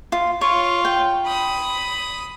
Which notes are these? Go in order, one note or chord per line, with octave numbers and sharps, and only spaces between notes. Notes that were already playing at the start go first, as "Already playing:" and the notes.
F4
F4 C#5
G5
B5 D#6